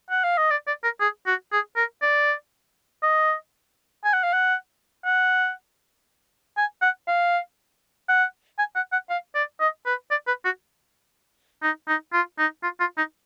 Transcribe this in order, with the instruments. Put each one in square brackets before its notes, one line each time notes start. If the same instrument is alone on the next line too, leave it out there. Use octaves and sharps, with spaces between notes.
[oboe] F#5
F5
D#5
D5
D5
A#4
G#4
F#4
G#4
A#4
D5
D#5
G#5
F#5
F5
F#5
F#5
G#5
F#5
F5
F#5
G#5
F#5
F#5
F5
D5
D#5
B4
D5
B4
F#4
D#4
D#4
F4
D#4
F4
F4
D#4